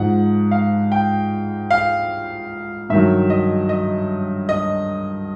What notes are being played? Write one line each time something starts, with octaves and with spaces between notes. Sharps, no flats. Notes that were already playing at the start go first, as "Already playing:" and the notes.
Already playing: G#2 F3 F#5
F5
G5
F5
G2 D#3 F#3 E5
D#5
D#5
D#5